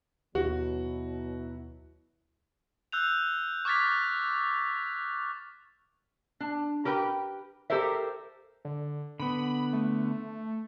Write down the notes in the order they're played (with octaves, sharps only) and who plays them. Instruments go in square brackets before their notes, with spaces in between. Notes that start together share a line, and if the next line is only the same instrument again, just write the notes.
[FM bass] D#2 [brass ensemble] B2 F#3 [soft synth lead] E4 [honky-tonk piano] F#4
[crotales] E6 F#6 G6 F7
C#6 D6 F6 G#6 A6 B6
[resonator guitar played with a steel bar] D4
G4 A#4 B4 G5
G4 A4 A#4 C5 E5
[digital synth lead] D3
[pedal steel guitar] D3 B3 [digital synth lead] B5
[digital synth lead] A3